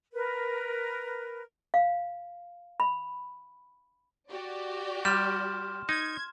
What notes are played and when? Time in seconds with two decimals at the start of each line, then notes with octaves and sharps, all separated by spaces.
0.13 A#4 B4
1.74 F5
2.80 B5
4.29 F#4 G4 D5
5.05 G3 C6 F6 E7
5.89 D#4 G#6